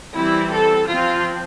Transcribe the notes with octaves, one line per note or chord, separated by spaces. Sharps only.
E3 G3 C4 E4
A4
F3 C4 F4